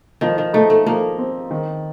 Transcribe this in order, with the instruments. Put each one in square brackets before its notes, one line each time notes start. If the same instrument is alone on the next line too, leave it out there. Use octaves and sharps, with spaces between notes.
[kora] D#3 [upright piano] F3
[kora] D#3
[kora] A3 [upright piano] D#4
[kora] A3
[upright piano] F3 [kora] A#3
[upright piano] C4
D#3